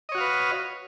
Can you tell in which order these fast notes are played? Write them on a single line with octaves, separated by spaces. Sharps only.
D#5 C#5 F#4 F5 B4